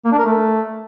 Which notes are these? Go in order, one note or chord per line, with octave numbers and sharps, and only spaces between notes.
A#3
D4
A#4
A3